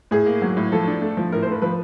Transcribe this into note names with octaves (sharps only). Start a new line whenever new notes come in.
A2 G#4
A#3
F#3
A2
F3 A4
D4
A3
F3
A2 A#4
C5
A3 B4
F3 B4